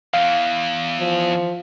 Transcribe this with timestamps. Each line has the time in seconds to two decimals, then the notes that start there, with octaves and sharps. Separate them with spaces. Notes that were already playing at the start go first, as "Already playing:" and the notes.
0.14 E2 E3 F5
0.99 F3